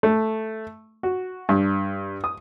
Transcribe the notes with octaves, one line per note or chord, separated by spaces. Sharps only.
A3
F#4
G2
D#6